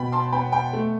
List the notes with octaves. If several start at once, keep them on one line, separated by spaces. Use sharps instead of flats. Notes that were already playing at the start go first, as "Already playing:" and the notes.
Already playing: B2 G5 B5
A5 C6
B3 G5 B5
G5 B5
A3